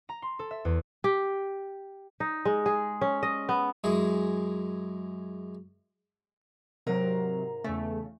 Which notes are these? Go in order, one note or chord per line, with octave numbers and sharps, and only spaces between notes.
A#5
C6
A4
E5
E2
G4
D#4
G#3
G#4
C#4
D#5
B3
F#2 G#3 E4 G#4
G#2 C3 F#3 A#4 F5
E2 C#3 A3